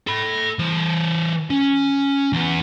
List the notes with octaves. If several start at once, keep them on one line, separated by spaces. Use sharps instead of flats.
A4 B5
E3 C5
C#4
E2 B3